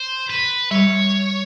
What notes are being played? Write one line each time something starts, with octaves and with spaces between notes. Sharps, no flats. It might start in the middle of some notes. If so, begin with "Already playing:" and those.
Already playing: C5
B4
G3 C#5